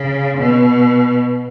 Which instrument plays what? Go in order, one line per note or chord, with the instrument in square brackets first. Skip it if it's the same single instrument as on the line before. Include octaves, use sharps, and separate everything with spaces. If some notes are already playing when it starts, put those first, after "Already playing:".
Already playing: [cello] C#3
B2